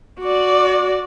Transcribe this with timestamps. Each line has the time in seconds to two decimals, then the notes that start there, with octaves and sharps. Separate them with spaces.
0.20 F#4 D5